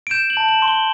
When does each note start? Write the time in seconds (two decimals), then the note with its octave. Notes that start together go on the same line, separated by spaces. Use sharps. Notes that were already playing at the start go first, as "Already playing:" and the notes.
0.07 D7
0.11 G6 E7
0.30 F#7
0.37 A5
0.48 F#7
0.62 C6
0.68 G7